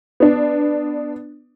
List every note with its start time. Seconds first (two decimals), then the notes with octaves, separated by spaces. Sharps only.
0.20 B3 D4